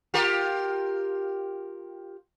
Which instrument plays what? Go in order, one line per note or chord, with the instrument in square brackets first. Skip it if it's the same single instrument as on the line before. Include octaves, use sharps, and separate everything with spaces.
[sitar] F4 G4 A#4